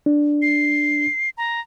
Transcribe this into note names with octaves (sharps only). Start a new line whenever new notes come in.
D4
C7
A#5